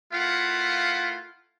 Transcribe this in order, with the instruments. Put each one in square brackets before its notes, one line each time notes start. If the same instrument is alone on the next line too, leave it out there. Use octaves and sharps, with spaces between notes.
[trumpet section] A3 E4 F4 A#4 F5 F#5